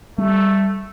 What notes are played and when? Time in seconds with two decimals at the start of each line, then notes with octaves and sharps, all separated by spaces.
0.18 G3 A3